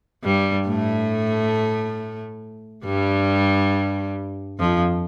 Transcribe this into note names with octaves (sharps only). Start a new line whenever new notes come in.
G2 G3
A2 A3
G2 G3
F2 F3